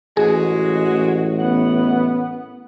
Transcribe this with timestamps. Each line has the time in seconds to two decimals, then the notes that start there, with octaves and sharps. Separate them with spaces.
0.17 A1 G#3 F#4 G#4
1.39 F#2 B3 F#5